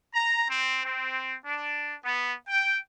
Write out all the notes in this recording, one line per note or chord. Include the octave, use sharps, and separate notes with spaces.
A#5
C4
C4
D4
B3
G5